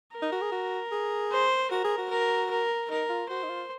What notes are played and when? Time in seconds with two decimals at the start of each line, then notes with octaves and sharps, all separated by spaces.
0.13 A#4
0.22 D#4
0.32 F#4
0.41 G#4
0.52 F#4
0.92 G#4
1.32 C5
1.71 F#4 A#4
1.84 G#4
1.98 F#4
2.10 A#4
2.50 A#4
2.90 D#4 A#4
3.10 F4
3.29 F#4 C5
3.44 D#4
3.49 F4